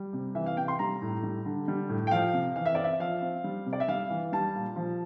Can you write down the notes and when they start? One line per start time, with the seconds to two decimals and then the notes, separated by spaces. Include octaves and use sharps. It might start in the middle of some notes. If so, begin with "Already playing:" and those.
Already playing: G3
0.13 C3
0.35 E3 E5
0.46 F5
0.57 C3 G5
0.68 C6
0.79 G3 A#5
1.02 A2
1.23 G3
1.46 D3
1.68 G3
1.89 A2
2.07 G5
2.11 F3 F5
2.33 C3
2.56 E3 F5
2.66 E5
2.75 C4 D5
2.84 E5
3.00 F3 F5
3.22 C4
3.44 G3
3.66 C3
3.73 D5
3.80 E5
3.88 G3 F5
4.10 E3
4.32 G3 A5
4.55 A#2
4.76 F3